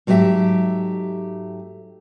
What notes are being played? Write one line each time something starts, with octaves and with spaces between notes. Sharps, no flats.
G#2 F#3 A3 G4 E5